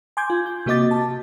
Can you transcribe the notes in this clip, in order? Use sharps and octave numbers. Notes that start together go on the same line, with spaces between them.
G#5 C6 D6 G6 G#6
F4
G6
C3 A#3 F#4 D#5 D6 A6
A5